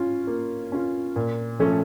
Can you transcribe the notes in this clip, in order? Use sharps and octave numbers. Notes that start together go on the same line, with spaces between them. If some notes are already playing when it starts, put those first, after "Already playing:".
Already playing: C#4 F4
A#3
C#4 F4
A#2
F3 A3 C#4 A4